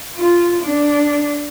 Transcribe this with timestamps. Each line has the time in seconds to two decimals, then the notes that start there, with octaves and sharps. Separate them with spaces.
0.17 F4
0.63 D4